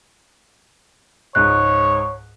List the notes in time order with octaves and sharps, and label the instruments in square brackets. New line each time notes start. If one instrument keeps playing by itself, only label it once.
[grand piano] C#2 G#2 D#5 [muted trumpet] C#5 [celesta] F#6